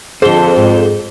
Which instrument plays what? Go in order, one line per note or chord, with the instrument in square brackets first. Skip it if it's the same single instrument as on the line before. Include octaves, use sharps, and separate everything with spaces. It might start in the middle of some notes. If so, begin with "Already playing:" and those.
[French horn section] F2 [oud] D3 A4 [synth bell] G#4 G7 [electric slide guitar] C5
[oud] G#2